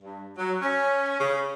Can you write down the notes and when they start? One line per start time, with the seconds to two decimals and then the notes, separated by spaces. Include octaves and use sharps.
0.02 G2
0.38 F#3
0.62 C#4
1.20 C#3